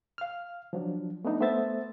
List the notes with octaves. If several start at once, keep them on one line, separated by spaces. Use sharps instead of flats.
F5 F6
F3 F#3 D4
A3 B3 D4 D#4
A3 B3 C5 E5 A6